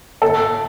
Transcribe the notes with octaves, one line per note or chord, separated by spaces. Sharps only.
A4